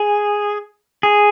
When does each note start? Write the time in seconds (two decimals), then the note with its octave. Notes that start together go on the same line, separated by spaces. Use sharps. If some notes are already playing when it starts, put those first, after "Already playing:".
Already playing: G#4
1.03 G#4